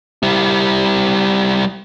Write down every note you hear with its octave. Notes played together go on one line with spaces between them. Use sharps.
G3 E4